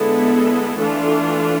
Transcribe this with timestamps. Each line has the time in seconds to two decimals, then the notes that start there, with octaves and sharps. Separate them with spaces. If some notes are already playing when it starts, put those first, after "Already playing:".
Already playing: D3 G#3 B3 E4 A4
0.77 E3 A3 D4 F4 A4